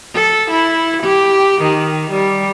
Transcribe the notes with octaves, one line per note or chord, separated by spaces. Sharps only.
A4
E4
G4
D#3
G3